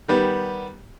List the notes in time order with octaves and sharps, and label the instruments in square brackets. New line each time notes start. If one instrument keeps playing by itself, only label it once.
[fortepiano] D#3 G3 B3